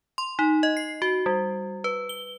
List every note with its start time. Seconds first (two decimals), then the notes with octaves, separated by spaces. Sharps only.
0.18 C6
0.39 D#4
0.63 D#5
0.77 C7
1.02 F#4
1.26 G3
1.84 B4
2.09 G7